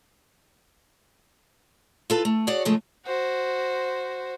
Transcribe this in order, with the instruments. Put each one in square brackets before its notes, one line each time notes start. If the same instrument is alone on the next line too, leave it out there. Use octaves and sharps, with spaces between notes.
[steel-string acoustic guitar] F4 A4 B4
A3
F#4 G#4 C#5 D5 F#5
C#3 F3 G#3 A3 G#4
[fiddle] F#4 C5